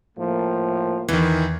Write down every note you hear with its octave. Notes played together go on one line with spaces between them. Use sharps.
A2 F3 A#3
E2 D#3 E3